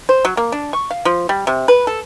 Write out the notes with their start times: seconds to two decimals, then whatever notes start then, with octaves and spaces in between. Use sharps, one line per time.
0.09 C5
0.25 F#3
0.37 A#3
0.52 D4
0.73 C#6
0.91 F5
1.05 F3
1.29 G3
1.47 C3
1.68 B4
1.87 A4